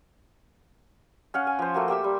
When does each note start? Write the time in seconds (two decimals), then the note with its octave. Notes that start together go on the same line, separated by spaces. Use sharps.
1.34 C#4 F5 F#5
1.47 G#5
1.59 F3 C5
1.74 A3 A#3 F#4
1.88 A#3 G4 E5 E6
2.04 G3